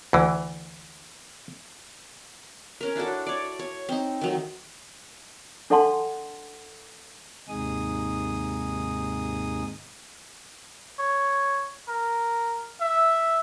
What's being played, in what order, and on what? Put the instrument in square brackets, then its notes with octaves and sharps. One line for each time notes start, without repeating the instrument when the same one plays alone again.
[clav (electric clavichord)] D2 E3
[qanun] C#4 A#4
D4 E4 F#4 A4
C#5 D5
C#5
C4 D#4
D#3 F#3 A3
[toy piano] D4 A4 D5 F#5 A5 C6
[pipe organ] D#2 G#2 C3 D#4 G#4 D#6
[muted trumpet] C#5
A#4
E5